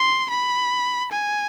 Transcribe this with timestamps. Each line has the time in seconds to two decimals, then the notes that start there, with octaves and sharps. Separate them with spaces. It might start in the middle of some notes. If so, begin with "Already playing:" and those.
Already playing: C6
0.30 B5
1.12 G#5